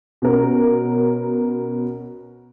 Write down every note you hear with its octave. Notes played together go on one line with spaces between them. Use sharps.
B2 B3 C#4 A#4